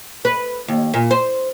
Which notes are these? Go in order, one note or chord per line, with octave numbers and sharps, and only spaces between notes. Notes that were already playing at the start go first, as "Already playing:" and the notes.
B4
D#2
A#2
C5